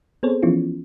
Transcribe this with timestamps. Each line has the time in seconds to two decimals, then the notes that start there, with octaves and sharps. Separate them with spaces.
0.23 B3 C4 G#4 A4 C5 C#5
0.42 E3 F3 B3 C#4 E4 F4